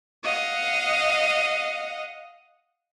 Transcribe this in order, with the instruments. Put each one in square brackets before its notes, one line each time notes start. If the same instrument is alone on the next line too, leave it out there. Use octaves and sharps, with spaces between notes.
[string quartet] D#5 F5 F#5